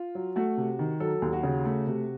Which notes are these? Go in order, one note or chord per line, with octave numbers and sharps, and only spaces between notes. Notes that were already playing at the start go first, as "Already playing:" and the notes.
Already playing: F4
F#3
A3 F#4
C3
D#3
F#3 A4
D#2
F#4
C#3
A3
C3